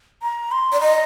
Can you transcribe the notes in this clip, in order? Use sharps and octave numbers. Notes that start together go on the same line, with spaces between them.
A#5
C6
D5
D#5 A#5